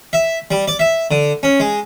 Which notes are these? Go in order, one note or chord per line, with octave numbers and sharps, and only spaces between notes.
E5
G3
D5
E5
D3
C#4
G#3